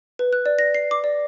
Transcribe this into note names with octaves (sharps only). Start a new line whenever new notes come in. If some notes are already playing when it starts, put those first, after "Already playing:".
B4
F#6
D5
A#6
C7
D6
D5